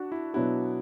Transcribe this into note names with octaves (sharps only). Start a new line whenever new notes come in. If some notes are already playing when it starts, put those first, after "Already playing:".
Already playing: D4 F#4
E4
B2 F#3 B3 D4 E4 F#4